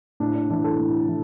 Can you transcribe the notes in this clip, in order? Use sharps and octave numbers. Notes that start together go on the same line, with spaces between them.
A2 D4
D4
E3 D4
A4
A2
E3